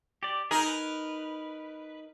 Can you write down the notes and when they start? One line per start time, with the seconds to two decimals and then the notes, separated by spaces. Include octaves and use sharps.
0.23 G4 D5
0.51 D#4 G#4 A#4
0.66 B4